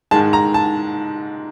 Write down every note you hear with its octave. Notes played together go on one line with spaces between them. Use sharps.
G#2 D#3 G#3 A5
A#5
A5